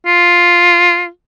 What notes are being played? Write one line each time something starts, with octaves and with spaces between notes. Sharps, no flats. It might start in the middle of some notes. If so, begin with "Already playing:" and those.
F4